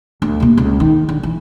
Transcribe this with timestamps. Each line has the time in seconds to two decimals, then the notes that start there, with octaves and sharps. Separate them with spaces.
0.22 D2
0.40 C3 A#3
0.57 C#2
0.80 D#3
1.09 D3
1.23 E3